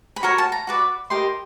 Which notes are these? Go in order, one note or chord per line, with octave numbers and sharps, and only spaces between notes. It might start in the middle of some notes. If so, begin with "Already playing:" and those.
B5
F#4 A#4 C#5 A#5
A5
A#5
F#4 B4 D5
D#4 G4 A#4 C6